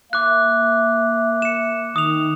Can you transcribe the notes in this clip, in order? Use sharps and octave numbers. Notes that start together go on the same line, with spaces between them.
A#3 E5 D6 F#6
C#7 E7
D#3 D#6 F7